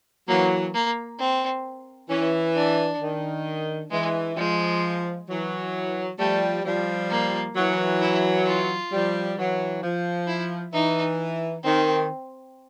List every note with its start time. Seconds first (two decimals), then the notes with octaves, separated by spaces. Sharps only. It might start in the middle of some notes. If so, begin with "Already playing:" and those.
0.28 E3 F#3 A#3
0.74 A#3
1.19 C4
2.10 E3 C#4
2.56 D4
3.00 D#3
3.91 E3 G#3
4.37 F3 G#3
5.28 E3 F#3
6.19 F3 G3 A3
6.64 F3 G3
7.11 A#3
7.55 E3 F#3
8.02 E4
8.46 F4
8.92 F3 G3
9.37 E3 F#3
9.83 F3
10.28 E4
10.73 E3 D#4
11.64 D#3 C4